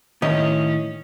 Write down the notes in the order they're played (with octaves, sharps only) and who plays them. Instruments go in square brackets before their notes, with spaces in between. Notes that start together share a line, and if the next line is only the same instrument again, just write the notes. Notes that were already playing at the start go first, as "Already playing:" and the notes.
[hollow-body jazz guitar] A2 D#3 [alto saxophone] C#4 [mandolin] D#5